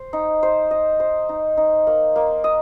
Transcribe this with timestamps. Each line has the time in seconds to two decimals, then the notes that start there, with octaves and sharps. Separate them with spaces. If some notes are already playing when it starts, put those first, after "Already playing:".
Already playing: C5
0.13 D#4
0.43 C5
0.71 D#5
1.00 C5
1.29 D#4
1.57 D#4
1.87 A#3
2.16 A#3
2.44 D#5